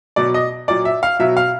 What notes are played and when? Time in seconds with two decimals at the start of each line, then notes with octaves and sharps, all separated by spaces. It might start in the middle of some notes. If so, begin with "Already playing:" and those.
0.16 B2 F#3 D5
0.34 D#5
0.68 A#2 F#3 D5
0.85 E5
1.03 F5
1.19 B2 F#3 E5
1.37 F5